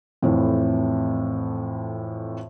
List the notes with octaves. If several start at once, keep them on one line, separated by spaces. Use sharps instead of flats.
F2 A2 E3